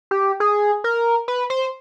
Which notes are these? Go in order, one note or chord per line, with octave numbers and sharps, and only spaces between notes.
G4
G#4
A#4
B4
C5